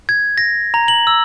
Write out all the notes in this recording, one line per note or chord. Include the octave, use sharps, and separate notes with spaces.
G#6
A#6
A#5
F#7
E6